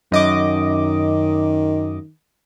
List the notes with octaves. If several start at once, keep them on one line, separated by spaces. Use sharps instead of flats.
F#2 D#3 D#5 D6